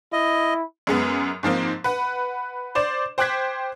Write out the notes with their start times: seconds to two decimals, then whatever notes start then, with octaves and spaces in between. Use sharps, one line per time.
0.13 E4 D#5
0.87 F#2 G#3 B3
1.43 G#2 F3 A#3 C4
1.84 B4 F#5
2.75 C5 D5 E7
3.18 C5 G5 D6 F#6 G#6 B6